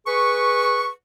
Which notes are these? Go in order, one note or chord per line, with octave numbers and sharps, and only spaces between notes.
G#4 B4 C#6